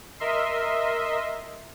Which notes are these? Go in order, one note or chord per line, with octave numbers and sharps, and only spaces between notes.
A#4 D#5 E5 C6